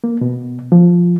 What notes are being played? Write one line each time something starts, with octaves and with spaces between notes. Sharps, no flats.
A#3
B2
F3